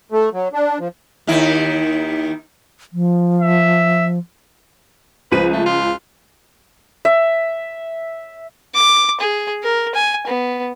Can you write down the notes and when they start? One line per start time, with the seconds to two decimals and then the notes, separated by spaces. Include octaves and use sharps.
0.12 A3
0.33 F#3
0.53 D4
0.80 F3
1.27 D#2 D#3 E4
2.93 F3
3.41 E5
5.32 C#2 F3 B4 D#7
5.53 A3
5.66 F4
7.05 E5
8.75 D6
9.20 G#4
9.63 A#4
9.95 G#5
10.27 B3